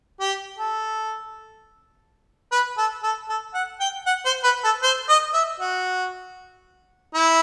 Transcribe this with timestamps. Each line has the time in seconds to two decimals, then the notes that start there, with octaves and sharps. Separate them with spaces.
0.20 G4
0.59 A4
2.52 B4
2.78 A4
3.03 A4
3.29 A4
3.54 F#5
3.80 G5
4.06 F#5
4.26 C5
4.44 B4
4.64 A4
4.83 C5
5.09 D#5
5.34 E5
5.60 F#4
7.14 E4